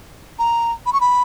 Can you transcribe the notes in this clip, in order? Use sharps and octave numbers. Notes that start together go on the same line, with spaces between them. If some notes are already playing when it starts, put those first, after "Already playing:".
A#5
B5
C#6
B5